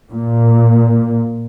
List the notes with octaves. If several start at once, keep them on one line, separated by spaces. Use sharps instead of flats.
A#2